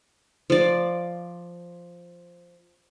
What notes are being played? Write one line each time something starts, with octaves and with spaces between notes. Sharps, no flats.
F3 D5